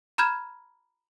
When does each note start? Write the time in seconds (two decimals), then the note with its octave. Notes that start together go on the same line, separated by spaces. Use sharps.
0.18 A#5 B5 F6 G6 G#6 E7